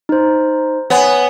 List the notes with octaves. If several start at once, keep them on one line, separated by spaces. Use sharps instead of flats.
D#4 C5
B3 C#5 G#5